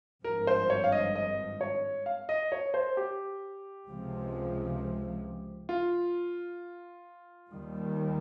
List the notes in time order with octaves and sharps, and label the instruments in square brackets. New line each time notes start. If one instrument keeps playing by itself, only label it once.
[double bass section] G#1 G2 F3 [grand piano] A#4
[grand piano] C5
C#5
F5
D#5
D#5
C#5
F5
D#5
C#5
C5
G4
[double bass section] C#2 C3 F3 G#3
[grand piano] F4
[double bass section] D#2 D#3 G3